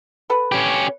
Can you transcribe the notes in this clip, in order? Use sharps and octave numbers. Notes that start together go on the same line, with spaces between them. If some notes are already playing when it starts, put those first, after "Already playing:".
A4 B4 F#5
C#4 G4